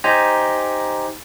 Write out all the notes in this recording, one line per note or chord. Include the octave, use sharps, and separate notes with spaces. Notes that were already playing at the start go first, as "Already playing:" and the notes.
D#4 G4 C5 G#5 A#5